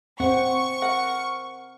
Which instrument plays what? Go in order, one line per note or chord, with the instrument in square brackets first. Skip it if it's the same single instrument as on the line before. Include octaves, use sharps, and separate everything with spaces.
[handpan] C4 C5 [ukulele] F#5 [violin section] C#6
[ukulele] A#4 F#5